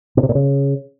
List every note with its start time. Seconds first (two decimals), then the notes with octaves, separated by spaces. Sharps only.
0.17 B2
0.23 C3
0.29 A#2
0.35 C#3